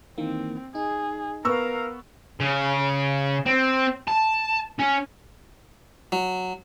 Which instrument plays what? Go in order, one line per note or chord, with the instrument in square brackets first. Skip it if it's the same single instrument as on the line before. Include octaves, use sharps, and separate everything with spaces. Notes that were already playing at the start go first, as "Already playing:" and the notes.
[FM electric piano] D#3 E3 A#3 [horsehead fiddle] C4
[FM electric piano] D#4 [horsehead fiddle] G#4
[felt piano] B3 C#6 E6 [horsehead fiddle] A#4 F5 [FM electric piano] A#5
[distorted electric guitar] C#3
C4
A5
C#4
[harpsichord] F#3